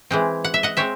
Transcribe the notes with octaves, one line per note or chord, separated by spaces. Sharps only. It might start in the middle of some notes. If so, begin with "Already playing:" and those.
E3 G#3 C4
F#5
E5
D#5 F#5
G#3 C4 C#5 E5